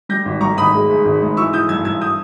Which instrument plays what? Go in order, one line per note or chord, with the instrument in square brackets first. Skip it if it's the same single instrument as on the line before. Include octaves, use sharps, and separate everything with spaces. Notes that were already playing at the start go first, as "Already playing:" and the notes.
[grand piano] G3 G6 A#6
G#1
G3 A#5 C#6
G#1 B5 D#6
G#3
G#2
G#1
G#2
E3 C#6 E6
E3 D#6 G6
G2 E6 G#6
G2 E6 G#6
D#6 G6